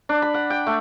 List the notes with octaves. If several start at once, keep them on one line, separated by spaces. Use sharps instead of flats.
D4
B5
F#5
G5
A3